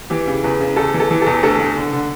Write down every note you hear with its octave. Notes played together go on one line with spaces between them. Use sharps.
E3 G4
C#3
E2 B4
C#3
E2 A4
E3
A4
E3
E2 A4
D2 A4
D2
D3
D3